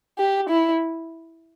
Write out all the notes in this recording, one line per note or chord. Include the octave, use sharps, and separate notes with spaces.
G4
E4